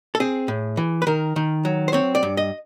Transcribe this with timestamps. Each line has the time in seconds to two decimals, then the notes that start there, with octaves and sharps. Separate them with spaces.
0.15 A4
0.20 C4 G#4
0.48 A2
0.77 E3
1.02 B4
1.07 D#3 A#4
1.36 D#3
1.65 F#3
1.88 C5
1.93 C4 C#5
2.15 D5
2.23 G2
2.37 D#5